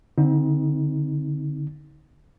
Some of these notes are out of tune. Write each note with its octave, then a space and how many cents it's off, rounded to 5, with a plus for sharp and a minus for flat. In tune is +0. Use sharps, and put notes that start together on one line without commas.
D3 -10 C4 +0 D#4 +35